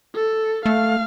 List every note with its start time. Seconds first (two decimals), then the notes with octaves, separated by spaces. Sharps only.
0.15 A4
0.66 A3 F5